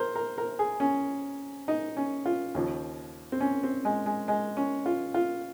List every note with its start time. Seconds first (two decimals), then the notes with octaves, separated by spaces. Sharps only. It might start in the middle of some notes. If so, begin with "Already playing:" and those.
Already playing: A#4 C5
0.15 A#4
0.38 A#4
0.59 G#4
0.80 C#4
1.68 D#4
1.97 C#4
2.26 F4
2.55 D#2 C#3 F3
3.32 C4
3.41 C#4
3.63 C4
3.85 G#3
4.06 G#3
4.28 G#3
4.57 C#4
4.86 F4
5.14 F4